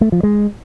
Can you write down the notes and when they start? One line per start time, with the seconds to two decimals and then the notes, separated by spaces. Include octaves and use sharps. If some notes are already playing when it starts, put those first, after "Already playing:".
0.01 A3
0.12 F3
0.23 G#3